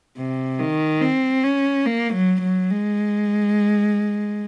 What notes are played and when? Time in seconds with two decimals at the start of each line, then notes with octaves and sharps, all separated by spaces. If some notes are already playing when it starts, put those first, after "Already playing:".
0.18 C3
0.60 D#3
1.02 C4
1.44 C#4
1.86 A#3
2.14 F#3
2.42 F#3
2.70 G#3